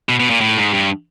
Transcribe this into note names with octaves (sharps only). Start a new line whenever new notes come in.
B2
B2
A#2
A2
G#2
G2